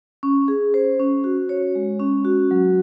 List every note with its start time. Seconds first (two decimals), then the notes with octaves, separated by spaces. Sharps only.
0.23 C#4
0.48 G#4
0.74 C5
1.00 C#4
1.24 F#4
1.49 C#5
1.75 G#3
2.00 C#4
2.25 F#4
2.51 F#3